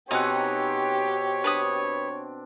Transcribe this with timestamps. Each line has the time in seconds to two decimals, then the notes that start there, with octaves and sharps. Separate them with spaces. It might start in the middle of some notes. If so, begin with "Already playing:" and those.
0.11 B2 C4 C#4 D#4 G4 C#5 F#5
1.44 D4 B4 B5 D#6